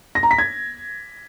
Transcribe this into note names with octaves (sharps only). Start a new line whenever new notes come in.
A#6
A#5
B6
G#6